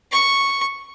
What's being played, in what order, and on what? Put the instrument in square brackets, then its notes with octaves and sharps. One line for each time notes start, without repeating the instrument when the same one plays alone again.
[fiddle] C#6